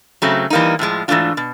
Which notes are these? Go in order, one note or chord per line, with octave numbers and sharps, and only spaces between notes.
C#3 F#3 A3 C4
E3 G3 A#3 D#4
A2 F3 G#3
G#2 E3 A3 D4 F4
B2